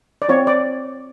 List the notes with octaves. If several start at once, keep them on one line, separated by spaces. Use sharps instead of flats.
D5
C4 F4 C#5
D5